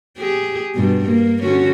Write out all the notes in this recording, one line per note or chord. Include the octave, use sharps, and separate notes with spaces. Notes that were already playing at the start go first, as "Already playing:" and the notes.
G4 G#4
G2 B2
A#3
D3 C#4 F#4